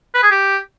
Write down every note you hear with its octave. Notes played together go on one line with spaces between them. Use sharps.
B4
G#4
G4